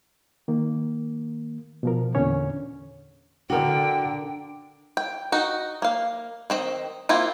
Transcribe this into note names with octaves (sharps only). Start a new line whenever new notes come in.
D#3 A#3
B2 F3 A#4
E2 A#2 D3 C#4 C#5
D3 D4 F#4 A#4 G5
G5
D#4 F#4
A#3 F5
D#3 C4 D#5
A#3 C4 E4 F4